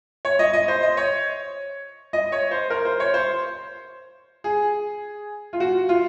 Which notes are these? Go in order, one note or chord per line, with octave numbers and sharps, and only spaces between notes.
C#5
D#5
D#5
C5
D#5
C#5
D#5
C#5
C5
A#4
C5
C#5
C5
G#4
F4
F#4
F4